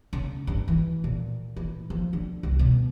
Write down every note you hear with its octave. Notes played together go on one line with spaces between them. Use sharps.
C#3
G2
E3
A#2
E3
F3
D3
C2
B2